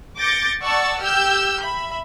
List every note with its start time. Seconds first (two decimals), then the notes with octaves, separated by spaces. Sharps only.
0.19 D6 G6 A6 A#6 C#7
0.62 D5 F#5 A5 C#6 E6 A6
1.02 G4 E6 F6 G6
1.61 E5 B5